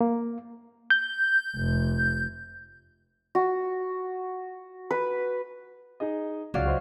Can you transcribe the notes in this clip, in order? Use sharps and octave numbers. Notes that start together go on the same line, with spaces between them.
A#3
G6
F1
F#4
B4
D#4 G#4 D#5
C#2 F#3 D5 F5
F#4 C5 D#5